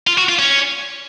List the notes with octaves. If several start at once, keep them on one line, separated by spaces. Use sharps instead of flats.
F4
F#4
F4
C#4